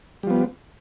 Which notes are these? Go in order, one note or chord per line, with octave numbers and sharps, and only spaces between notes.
F3 G3 B3